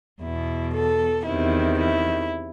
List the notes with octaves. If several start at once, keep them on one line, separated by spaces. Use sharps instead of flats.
E2 B2 E4
A4
E2 C3 D#3 E4
E4